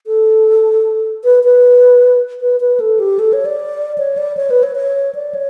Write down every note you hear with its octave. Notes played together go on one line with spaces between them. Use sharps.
A4
B4
B4
B4
B4
A4
G4
A4
C#5
D5
C#5
D5
C#5
B4
C#5
C#5
D5
C#5